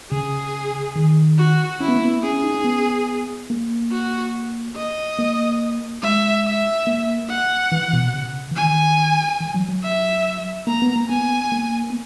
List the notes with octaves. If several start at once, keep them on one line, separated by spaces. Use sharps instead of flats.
C#3 G#4
D#3
F#4
C#4 E4
B3
A#3
B3
C#4 G#4
C#4
D#4
C#4
B3
A#3
F#4
D#5
A#3
G#3 E5
E5
A#3
F#5
E3
B2
C#3
E3
D#3 G#5
E3
F#3
F#3
E5
A#3 A#5
B3
A#3
B3 G#5
A#3
B3